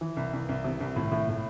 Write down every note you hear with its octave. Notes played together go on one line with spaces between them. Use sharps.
E3
C2
C2
C2
C3
C2
A2
A2
A2